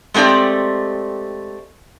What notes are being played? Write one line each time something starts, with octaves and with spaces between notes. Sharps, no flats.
G#3 A3 C4 G4 D5